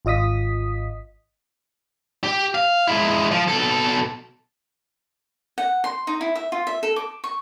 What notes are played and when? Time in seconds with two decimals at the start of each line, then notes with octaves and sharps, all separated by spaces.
0.05 G#1 F4 D#5 D#6 B6
2.24 G4
2.55 F5
2.87 G#3 E4
3.31 F3
3.48 B2 A4
5.58 F#5
5.84 C6
6.07 D#4
6.21 E4
6.35 E5
6.52 F4
6.67 E5
6.83 A4
6.96 D6
7.24 C#6